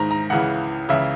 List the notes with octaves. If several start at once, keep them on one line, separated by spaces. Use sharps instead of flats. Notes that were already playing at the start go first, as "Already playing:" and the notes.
Already playing: G#2 D#3 A#5
A#5
C#2 C#3 E3 F#5
C#2 C#3 E3 E5